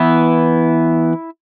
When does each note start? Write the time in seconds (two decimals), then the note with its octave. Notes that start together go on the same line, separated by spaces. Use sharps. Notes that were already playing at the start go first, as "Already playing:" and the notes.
Already playing: E3 B3 E4